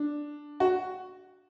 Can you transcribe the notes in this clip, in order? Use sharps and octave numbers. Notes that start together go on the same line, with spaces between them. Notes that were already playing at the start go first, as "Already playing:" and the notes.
Already playing: D4
F#4